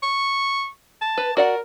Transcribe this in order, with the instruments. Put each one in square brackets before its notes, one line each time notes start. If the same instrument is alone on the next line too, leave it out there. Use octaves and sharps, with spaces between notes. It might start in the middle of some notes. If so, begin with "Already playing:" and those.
[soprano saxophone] C#6
A5
[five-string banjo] B4
[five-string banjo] F#4 D5 F#5 [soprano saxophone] A#4